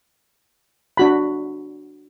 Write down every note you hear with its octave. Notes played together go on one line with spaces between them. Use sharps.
D4 F#4 B5